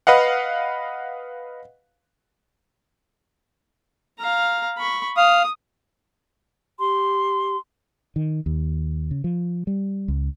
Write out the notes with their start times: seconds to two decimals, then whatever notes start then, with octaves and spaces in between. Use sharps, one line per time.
0.07 B4 D#5 F5 F#5
4.19 F5 A#5
4.78 B5 C#6
5.17 F5 D#6
6.79 G4 C6
8.16 D#3
8.46 D#2
9.11 C#3
9.24 F3
9.67 G3
10.08 C#2